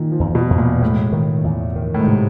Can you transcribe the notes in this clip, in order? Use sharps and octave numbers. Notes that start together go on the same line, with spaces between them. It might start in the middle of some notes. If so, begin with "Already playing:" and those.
Already playing: A#2 D#3
F3
E2
B2
E2
A#2
A2 G#3
D#3
E2
D#3
A2
G#2
C3